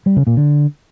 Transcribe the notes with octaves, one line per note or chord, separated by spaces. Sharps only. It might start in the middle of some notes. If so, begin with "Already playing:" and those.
G3
C#3
A#2
D3